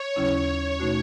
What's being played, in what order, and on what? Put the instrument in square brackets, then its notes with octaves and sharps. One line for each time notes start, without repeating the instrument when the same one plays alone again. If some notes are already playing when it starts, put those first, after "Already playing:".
Already playing: [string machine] C#5
[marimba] D#2 C#3 F#3 C#4 E4
B2 A3 D#4 F#4